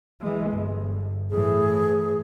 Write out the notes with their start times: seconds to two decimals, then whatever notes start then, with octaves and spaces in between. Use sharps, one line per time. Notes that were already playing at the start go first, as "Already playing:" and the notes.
0.21 E3 G#3
0.51 G1
1.30 A2 E3 G#4